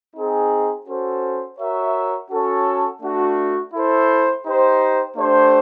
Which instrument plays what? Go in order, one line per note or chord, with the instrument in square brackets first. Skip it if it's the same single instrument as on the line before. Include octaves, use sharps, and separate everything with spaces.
[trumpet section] C4 D#4 G#4
C#4 F#4 A4 C5
F#4 A#4 C#5 E5
C#4 F#4 A4 C#5
A3 D4 F#4
E4 A4 C5
D#4 G4 C5
A3 D4 G4 C5